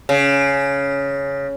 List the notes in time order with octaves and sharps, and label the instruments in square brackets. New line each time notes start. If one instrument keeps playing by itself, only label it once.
[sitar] C#3